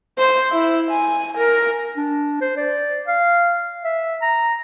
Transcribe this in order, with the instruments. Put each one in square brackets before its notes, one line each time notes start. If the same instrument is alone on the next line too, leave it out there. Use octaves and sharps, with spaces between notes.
[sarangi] C5
E4
G#5
A#4
[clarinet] D4
C5
D5
F5
E5
A#5